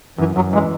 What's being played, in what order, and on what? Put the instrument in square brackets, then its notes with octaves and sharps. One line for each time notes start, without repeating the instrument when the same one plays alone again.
[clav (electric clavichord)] F#2 [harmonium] E3
[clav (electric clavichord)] F#2 [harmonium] F#3
[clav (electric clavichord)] E3 [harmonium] G#3